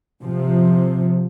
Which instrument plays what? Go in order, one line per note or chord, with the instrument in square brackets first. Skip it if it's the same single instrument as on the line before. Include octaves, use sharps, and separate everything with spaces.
[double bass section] C3 F3